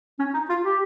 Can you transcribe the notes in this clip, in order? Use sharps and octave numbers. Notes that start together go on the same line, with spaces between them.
C#4
D#4
F4
G4